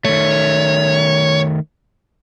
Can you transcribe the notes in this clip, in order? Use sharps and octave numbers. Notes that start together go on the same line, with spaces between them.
D#3 A3 C#5